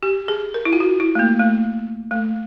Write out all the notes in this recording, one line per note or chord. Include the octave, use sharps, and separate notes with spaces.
G4
G#4
A#4
E4
F4
F#4
E4
A3
A#3
A3
A3